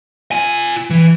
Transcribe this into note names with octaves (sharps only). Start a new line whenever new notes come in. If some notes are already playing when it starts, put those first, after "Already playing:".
F4 G#5
E3